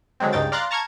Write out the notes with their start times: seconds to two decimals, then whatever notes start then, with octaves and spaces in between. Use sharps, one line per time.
0.20 D3 F#3 G#3 C4
0.33 C#2 G2 C#3 D#4 G5 A6
0.52 D5 F5 A#5 C6 F#6 A6
0.71 A5 A#5 C#6 F6 G#6